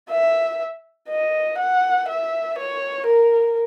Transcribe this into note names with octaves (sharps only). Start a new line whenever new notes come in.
E5
D#5
F#5
E5
C#5
A#4